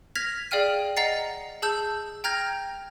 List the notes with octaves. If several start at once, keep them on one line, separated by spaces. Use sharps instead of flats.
F6 G#6 A#6 B6 F7
G#4 D5 F5 G5 F6 D#7
D#5 F#5 A#5 A6 C7
G#4 A5 E6 G6
G5 A#5 F6 G6 G#6 A#6